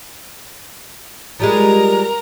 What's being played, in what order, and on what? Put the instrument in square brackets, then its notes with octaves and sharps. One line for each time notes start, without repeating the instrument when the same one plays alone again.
[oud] F3 G3 G#3 [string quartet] A#4 A#5